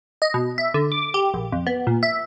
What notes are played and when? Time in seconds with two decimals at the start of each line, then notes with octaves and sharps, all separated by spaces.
0.22 D#5
0.34 B2
0.58 E5
0.74 D3
0.92 D6
1.14 G4
1.34 A#1
1.52 F2
1.67 B3
1.87 A#2
2.03 E5